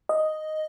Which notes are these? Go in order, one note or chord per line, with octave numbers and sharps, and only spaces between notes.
D#5